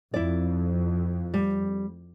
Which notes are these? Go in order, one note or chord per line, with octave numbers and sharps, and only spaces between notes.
F2 E4 D5
G3